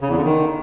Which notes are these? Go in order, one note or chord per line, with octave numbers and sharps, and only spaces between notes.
C#3
E2
D3
D#3